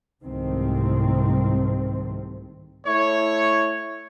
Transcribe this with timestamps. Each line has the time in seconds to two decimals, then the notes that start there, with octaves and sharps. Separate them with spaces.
0.23 C2 G#2 C3 D#3 A3 C4
2.86 A3 E4 C#5